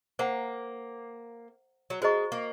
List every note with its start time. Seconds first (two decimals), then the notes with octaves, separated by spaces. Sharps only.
0.19 A#3 C5 F#5 A#5
1.90 F#3
2.02 G#3 F#4 C5 D#5 A#5 C#6
2.32 A#3